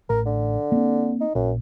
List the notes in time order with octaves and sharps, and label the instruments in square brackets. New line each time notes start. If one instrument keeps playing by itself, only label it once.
[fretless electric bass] A1 [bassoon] A#4
[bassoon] D3
[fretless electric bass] A#3 C4
[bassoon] D#4
[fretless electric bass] A#1 [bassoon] F#2